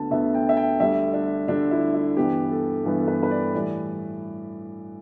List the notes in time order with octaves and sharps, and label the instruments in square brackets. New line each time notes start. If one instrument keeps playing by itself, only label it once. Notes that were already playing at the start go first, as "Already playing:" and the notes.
Already playing: [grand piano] D2 D3 B3 A5
D2 D3 B3 E5
G5
E5
G5
D2 D3 G3 E5
D4
D2 D3 G3 D4
E4
E4
G2 E3 B3 G4
A4
G2 E3 B3 A4
A4
B4
B4
D5
A2 E3 G3 D5